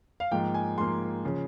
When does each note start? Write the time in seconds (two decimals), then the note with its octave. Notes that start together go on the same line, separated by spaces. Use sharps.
0.20 F5
0.31 G#2 F3 A#3 G5
0.54 G#5
0.78 G#2 F3 A#3 C6
1.25 C#3 F3